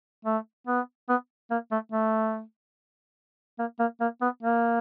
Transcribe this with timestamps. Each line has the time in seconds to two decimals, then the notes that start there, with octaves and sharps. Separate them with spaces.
0.25 A3
0.67 B3
1.09 B3
1.51 A#3
1.71 A3
1.92 A3
3.59 A#3
3.80 A#3
4.01 A#3
4.22 B3
4.42 A#3